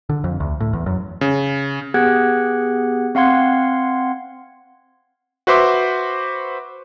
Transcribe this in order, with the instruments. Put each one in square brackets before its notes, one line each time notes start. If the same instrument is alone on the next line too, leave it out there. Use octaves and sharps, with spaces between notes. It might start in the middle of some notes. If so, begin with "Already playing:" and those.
[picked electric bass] D3
F2
D2
A2
E2
F#2
[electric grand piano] C#3
[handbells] B3 G4 G#4 F#5 F#6 G#6
C4 F5 F#5 C6 G#6
[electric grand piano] F#4 B4 C5 E5 C6 D6